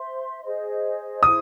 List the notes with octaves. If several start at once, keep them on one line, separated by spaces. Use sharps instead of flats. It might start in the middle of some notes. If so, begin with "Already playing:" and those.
Already playing: C5 E5 C6
G#4 C5 D#5
E4 G#4 C5 D#6